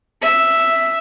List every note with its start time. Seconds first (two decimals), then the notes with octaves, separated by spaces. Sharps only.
0.23 E5